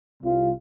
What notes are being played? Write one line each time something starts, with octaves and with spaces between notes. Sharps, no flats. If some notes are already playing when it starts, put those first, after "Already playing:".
C2 C3 G3 F4